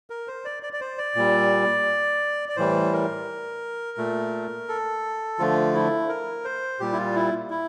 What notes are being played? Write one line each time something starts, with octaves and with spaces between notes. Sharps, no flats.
A#4
C5
D5
D5
D5
C5
D5
A#2 G3
D5
A2 E3 G3 C5
A#4
A#2 A3
A4
D3 F3 A3 F4
E4
A#4
C5
A#2 G3 G4
E4
F4
E4
E4